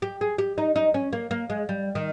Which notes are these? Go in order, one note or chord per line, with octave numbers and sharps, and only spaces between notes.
G4
G#4
G4
D#4
D#4
C#4
A#3
A#3
G#3
G3
D#3